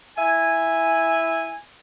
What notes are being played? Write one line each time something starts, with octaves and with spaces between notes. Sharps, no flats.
E4 E5 G#5